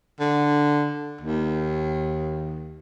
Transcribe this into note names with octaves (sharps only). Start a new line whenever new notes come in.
D3
D#2